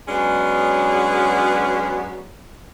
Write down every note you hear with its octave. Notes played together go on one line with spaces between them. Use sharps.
F#3 G#3 B3 C#4 D4 G#4